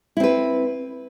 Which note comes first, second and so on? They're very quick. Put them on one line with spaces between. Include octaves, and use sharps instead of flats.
E4 C4 B4